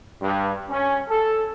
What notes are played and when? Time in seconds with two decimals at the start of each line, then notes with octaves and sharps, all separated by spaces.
0.22 G2
0.69 C#4
1.09 A4